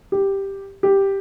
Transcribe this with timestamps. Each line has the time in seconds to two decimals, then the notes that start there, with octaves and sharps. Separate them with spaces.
0.12 G4
0.83 G4